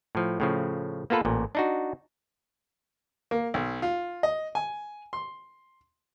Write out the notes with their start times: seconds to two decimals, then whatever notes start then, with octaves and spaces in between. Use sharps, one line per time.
0.15 A2 F3
0.40 A2 C#3 F3
1.10 A#3 B3 F4 A4 B4
1.25 A1 A#2
1.55 D4 D#4 F#4
3.31 A#3
3.54 B1
3.82 F4
4.23 D#5
4.55 G#5
5.13 C6